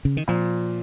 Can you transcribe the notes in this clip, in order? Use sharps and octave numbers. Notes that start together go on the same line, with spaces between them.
C#3
D#3
A#2 F3